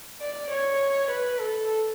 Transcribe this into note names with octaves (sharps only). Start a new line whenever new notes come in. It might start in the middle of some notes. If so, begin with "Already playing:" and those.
D5
C#5
B4
A4